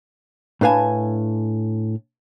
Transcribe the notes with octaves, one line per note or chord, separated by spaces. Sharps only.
A2 D4 B4 F5 G#5 A5